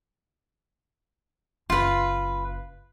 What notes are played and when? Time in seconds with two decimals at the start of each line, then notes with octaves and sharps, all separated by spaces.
1.70 F#1 F4 B4